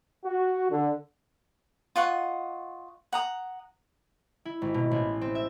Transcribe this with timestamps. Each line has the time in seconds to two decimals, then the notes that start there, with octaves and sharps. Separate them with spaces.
0.25 F#4
0.70 D3
1.96 F4 D#5 F#5 C#6
3.13 F#5 A#5 D#6
4.45 E4
4.62 G#1
4.74 B2
4.91 A1
5.21 C4
5.35 E5